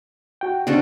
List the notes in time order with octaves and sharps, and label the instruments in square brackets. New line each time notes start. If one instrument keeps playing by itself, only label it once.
[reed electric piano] F#4 G5
[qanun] C#3 F#4 A4 [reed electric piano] C4 D4